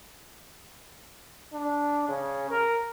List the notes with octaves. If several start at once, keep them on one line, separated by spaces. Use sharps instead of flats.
D4
C#3
A#4